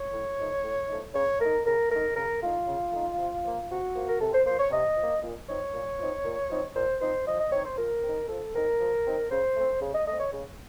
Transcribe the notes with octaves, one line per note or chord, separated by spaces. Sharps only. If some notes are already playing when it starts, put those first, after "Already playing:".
Already playing: C#5
A2
F3 A3 D#4
A2
F3 A3 D#4
C#3 C#5
A3 D#4 A#4
C#3 A#4
A3 D#4 A#4
C#3 A#4
A3 D#4 F4
C#3
A3 D#4
C3
F3 A#3
C3 F#4
F3 A#3
A#4
C3 A4
C5
F3 A#3 C5
C#5
C3 D#5
F3 A#3
A#2
F3 C4 D#4 C#5
A#2
F3 C4 D#4
A#2
F3 C4 D#4
A#2 C5
F3 C4 D#4 C5
F3 D#5
D#5
C4 D#4 C#5
C5
F3 A#4
C4 D#4
F3 A4
C4 D#4 A#4
F3
C4 D#4
C#3 C5
A3 C4
C#3
D#5
A3 C4 D#5
C#5
C#3